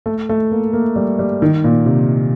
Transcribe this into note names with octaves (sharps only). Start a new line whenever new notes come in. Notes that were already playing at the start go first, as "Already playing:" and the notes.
A3
A3
A#3
A#3
G3
G3
D#3
A#2
C3